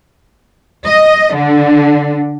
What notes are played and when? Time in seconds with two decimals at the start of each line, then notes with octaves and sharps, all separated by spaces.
0.86 D#5
1.35 D3